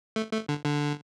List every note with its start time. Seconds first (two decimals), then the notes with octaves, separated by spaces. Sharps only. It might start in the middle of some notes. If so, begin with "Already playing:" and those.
0.16 A3
0.33 A3
0.49 D3
0.64 D3